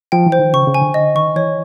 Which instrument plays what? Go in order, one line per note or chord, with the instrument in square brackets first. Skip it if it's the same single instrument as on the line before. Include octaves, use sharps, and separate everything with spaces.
[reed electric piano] F3 [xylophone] G5
[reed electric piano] E3
[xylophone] C5
[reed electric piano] D#3
[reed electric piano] C#3 [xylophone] C#6
[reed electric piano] C#3
[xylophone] G#5
[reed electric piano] D3
[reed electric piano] D3 [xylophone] D#5
[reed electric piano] D#3 [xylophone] C#6
[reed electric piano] E3 [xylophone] C#5